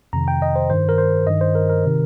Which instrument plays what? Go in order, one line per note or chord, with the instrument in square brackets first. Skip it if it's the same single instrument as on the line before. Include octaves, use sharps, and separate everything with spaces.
[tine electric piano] F2 C3 D#3 A#5
G5
D#5
C5
G2 D#3 C5
A#4
C5
G2 D#3 D#5
C5
A#4
A#4
C3 D#3